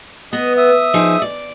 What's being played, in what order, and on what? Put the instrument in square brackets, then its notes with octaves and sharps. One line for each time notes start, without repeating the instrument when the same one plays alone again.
[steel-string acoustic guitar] B3 [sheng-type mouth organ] D#5 D#6
[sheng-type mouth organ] E5 D#6
[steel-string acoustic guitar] F3 D#4 G#4
D5